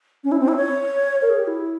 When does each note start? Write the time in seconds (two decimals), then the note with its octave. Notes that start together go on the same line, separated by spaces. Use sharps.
0.24 C#4
0.32 E4
0.40 C4
0.48 E4
0.57 C#5
1.22 A#4
1.30 G#4
1.39 G4
1.47 E4